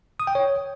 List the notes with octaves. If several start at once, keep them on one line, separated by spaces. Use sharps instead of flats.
D#6
G5
C#5